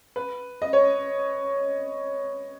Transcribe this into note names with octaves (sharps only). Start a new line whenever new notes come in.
B4
D#5
C#5